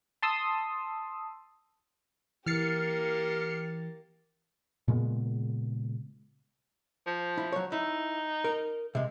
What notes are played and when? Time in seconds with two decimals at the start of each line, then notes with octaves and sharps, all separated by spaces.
0.22 A5 C6 D#6 E6
2.46 E3 A#3 G4 F6 A6 C7 C#7
4.88 A#2 C#3 G#3 B3
7.07 F3
7.38 E4
7.52 F#3 C#5
7.72 D#4 E4
8.44 A#4
8.95 C3 G#3